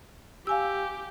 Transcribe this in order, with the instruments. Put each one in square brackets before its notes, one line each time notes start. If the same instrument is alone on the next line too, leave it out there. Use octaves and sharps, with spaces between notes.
[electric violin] G4 [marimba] F5 G#5 E6